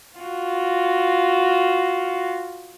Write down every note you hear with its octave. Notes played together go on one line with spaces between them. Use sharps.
F4 F#4